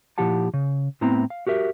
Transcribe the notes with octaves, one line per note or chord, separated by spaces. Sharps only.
A#2 F3 E4 G4 F#5 A5
C#3
A2 B3 C4 E4 A#5
F5
F#4 G4 A#4 E5